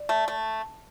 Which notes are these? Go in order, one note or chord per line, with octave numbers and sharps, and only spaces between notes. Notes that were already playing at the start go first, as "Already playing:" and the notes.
Already playing: D5
A3
A3